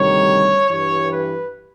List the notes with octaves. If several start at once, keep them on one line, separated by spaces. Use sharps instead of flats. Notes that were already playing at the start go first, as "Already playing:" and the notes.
Already playing: D2 C3 D#3 G3 C#5
G2 E3 G3 C#5
B4